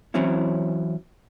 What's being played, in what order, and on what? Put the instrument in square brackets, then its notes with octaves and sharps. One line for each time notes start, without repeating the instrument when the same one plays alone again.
[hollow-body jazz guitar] E3 F#3 C4 C#4 E4